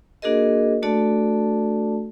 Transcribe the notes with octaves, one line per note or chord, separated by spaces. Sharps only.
A#3 D4 F#4 G#4 A#4 D#5
A3 D4 F#4 A4 D5 A5